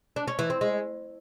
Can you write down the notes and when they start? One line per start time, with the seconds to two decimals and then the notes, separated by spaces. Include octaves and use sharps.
0.16 D4
0.28 C#4
0.39 E3
0.50 C4
0.61 G#3